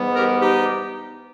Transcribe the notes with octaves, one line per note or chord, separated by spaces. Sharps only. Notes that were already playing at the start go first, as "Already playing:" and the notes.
Already playing: G#2 E3 G3 B3
G4 A#4
D#4 G4